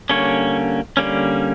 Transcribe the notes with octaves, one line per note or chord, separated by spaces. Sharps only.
D3 G3 A#3 C#4 C#5
D3 G3 A#3 C#4